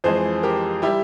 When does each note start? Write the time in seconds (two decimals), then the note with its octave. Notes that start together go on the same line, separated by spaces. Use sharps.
0.04 F2 E3 G#3 G#4 C5
0.43 G4 A#4
0.82 G3 E4 G4